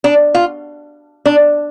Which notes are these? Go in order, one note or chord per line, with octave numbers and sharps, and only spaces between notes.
D4
F4
D4